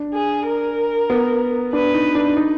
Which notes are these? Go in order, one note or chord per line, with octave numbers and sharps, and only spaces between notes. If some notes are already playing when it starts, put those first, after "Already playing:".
Already playing: D4
G#4
A#4
B3
D4 B4
D#4
D4
D#4